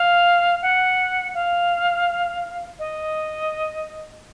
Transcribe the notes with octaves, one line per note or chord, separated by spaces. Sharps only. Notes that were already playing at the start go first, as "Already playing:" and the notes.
Already playing: F5
F#5
F5
D#5